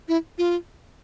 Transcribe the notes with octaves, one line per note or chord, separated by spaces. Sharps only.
E4
F4